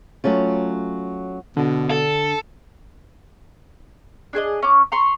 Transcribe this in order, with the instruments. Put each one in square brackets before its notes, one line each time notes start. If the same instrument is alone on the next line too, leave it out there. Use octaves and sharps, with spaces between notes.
[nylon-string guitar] F#3 A3 C#4 F4
[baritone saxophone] B2 [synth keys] D3
[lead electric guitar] A4
[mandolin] D4 G#4 C5 D#5
C#4 D6
A#5 C6 C#6